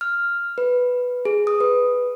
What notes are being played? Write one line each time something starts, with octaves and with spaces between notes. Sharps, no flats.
F6
B4
G#4
D#6
B4